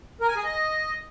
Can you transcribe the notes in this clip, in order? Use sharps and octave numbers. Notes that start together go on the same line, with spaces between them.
A#4
G#5
G#4
D#5